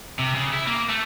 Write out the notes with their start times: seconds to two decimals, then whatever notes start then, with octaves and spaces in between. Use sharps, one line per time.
0.19 C3
0.35 C#3
0.53 E4
0.67 A#3
0.89 A3